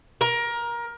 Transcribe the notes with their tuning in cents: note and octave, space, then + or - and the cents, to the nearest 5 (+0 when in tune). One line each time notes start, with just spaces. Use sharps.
A#4 +20